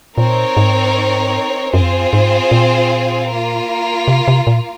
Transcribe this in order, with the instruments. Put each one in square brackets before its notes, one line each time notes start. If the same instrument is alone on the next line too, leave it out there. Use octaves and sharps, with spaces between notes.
[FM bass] A#2 [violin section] C4 D#4 A#4 C#5
[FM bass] G#2
[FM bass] F#2 [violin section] C4 F4 G#4 C5
[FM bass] F2
F#2
G#2
A#2
[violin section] A#3 F4 A#4
[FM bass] C3
C3
A#2